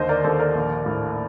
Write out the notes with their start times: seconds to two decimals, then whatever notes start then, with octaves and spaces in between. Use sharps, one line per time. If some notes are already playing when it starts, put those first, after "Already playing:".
Already playing: D#2 D3 C5 D#5
0.09 A#4 D5
0.24 D#2 A4 C5
0.39 A#4 D5
0.55 A#1
0.86 A2